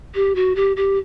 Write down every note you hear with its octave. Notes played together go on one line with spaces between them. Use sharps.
G4
F#4
G4
G4